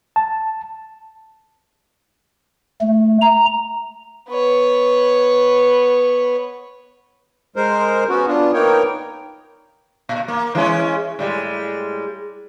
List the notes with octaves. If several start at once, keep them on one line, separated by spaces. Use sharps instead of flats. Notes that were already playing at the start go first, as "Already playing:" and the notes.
A5
A3
A#5
B3 C#5
G#3 A#4 C5
B3 C#4 F#4
B3 D4 F4
A#3 B3 D#4 A#4 C#5 G5
A#2
A#3
E3 G#3 C#4
A2 G3 G#3